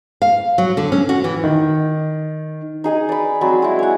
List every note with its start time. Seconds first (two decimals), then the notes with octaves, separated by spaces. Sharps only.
0.22 F5
0.58 F#3
0.77 D3
0.92 C#4
1.09 F#4
1.24 E3
1.44 D#3
2.84 D#4 G#4 D#5
3.09 D5 B5
3.41 F#3 C4 D5 B5
3.62 G#3 E4
3.79 C#5 F#5